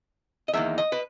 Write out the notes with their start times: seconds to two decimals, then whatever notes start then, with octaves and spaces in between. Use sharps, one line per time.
0.48 D#5
0.53 E2 D#3 A#3 E5
0.78 D#5
0.92 B4